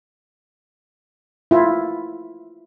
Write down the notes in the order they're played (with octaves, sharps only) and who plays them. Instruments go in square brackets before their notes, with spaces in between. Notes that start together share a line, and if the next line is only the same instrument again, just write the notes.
[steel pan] E4 F4